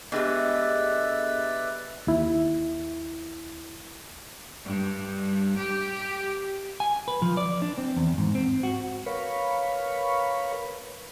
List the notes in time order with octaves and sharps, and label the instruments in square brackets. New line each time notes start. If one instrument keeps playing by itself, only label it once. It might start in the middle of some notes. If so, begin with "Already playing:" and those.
[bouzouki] G#3 A3 [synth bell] B3 D4 G4 [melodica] B4 D5 E5
[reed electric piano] D#2 E4
[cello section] G2
G4
[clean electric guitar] G#5
B4
F3
D5
D4
C4
E2
G#2
C4
F#4
[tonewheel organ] A#4 B4 C#5 F5 B5 C#6